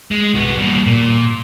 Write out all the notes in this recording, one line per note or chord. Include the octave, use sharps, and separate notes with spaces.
G#3
C2 B3
G3 A#3
A#2